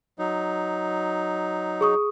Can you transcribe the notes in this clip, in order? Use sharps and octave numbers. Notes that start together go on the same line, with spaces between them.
F#3 D#4
G#4 C#6 D#6